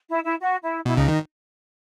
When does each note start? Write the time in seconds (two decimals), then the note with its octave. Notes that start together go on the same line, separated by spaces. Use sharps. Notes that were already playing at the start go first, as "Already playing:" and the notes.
0.09 E4
0.24 E4
0.40 F#4
0.62 E4
0.85 B2 E4
0.97 C#2 C#3 D#4
1.08 D#3 D#4